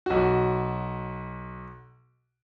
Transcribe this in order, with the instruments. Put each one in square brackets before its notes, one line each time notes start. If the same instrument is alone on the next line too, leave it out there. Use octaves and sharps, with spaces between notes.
[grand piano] B1 F#4